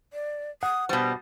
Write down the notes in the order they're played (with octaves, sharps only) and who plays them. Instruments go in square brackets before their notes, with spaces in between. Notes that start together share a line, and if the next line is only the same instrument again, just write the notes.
[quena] D5
[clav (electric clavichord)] F#5 [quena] D#6
[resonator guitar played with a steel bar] B2 G3 [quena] C5